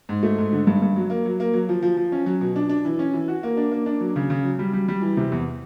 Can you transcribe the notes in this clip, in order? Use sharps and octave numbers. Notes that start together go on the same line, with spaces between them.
G#2
A3
G#2
D3
G2
G2
F#3
A#3
F#3
A#3
F#3
F3
F3
F3
C#4
F#3
B2
D4
D4
E3
C#4
E3
F#4
A#3
D4
A#3
D4
F#3
C#3
C#3
F#3
G3
G3
G3
E3
C3
E2